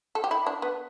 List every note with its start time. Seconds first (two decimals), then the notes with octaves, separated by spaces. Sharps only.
0.15 A4
0.24 G4
0.31 E4
0.47 D4
0.62 B3